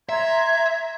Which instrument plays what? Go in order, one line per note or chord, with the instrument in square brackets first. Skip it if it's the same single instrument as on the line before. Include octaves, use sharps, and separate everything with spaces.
[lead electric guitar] E5 [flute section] A#5 C6 G#6